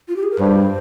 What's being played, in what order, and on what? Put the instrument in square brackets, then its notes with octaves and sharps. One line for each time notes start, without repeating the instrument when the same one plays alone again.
[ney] F4
G4
G#4
A#4
[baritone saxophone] G2 [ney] C5